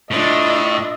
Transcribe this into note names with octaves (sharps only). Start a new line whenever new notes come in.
A2 D4 F4 D#5 E5